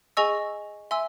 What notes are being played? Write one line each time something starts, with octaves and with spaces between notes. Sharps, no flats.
G#4 D#5 G#5 C#6 E6
E5 G#5 C6 E6